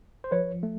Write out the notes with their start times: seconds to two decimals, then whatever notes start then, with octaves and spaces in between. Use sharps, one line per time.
0.24 C5
0.31 F3 B4 C#5
0.63 A3